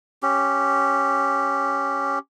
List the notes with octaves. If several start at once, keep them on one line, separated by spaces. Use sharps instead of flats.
C#4 G4